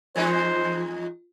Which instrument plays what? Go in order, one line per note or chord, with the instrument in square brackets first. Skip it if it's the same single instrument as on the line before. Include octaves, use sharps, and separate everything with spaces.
[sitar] E2 G#3 D#4 [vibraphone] F4 [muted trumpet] C5